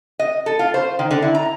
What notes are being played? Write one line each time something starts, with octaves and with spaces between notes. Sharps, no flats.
D#5
A4
F4
C5
D#3
D3
E4
A#5